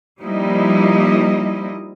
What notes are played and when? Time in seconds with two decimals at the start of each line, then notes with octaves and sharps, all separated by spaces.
0.21 F3 G3 A#3 D#4 E4 D#5